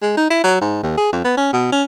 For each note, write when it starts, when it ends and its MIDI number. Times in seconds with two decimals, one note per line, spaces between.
0.02 0.17 56
0.17 0.29 63
0.30 0.43 64
0.44 0.59 54
0.61 0.80 44
0.83 0.93 39
0.97 1.09 68
1.12 1.24 41
1.24 1.34 59
1.37 1.49 61
1.53 1.70 47
1.72 1.83 61